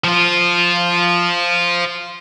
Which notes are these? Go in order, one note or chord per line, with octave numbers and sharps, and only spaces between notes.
F3 F4